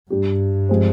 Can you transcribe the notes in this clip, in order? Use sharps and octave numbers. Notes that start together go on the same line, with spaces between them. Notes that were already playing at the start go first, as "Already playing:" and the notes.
G2 G3 D4 G4
F3 G#3 C4 G4 C5